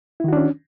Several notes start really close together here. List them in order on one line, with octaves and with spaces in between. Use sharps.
E4 D#3 F#4 D4 C#4